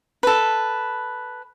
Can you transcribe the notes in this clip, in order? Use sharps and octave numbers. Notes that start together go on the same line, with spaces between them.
A4 B4